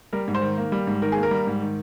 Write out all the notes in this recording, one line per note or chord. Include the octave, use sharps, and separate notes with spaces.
G3 A#4
G#2
C5
D#3
A#3
G3
G#2
D#3 A#4
A#3 G#4
A#4
G3
G#2
D#3